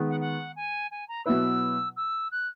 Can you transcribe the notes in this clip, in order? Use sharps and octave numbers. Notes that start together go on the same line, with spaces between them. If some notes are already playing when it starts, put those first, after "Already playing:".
Already playing: D#3 G#3 B3
F#5
F#5
G#5
G#5
A#5
B2 F#3 B3 E4 B4 E6
E6
F#6